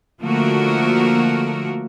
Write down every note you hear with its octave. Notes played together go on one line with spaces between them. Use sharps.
D3 F3 A3 A#3 F#4 A#4